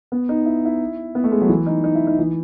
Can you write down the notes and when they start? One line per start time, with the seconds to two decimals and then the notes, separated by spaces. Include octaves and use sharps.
0.12 B3
0.29 D#4
0.46 E4
0.65 E4
1.15 B3
1.24 A3
1.32 G#3
1.41 F#3
1.49 E3
1.66 D#4
1.84 D#4
1.95 E4
2.07 D#4
2.19 E3